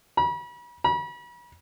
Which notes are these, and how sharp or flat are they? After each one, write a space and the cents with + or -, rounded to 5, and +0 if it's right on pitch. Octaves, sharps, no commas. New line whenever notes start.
B5 -40
B5 -40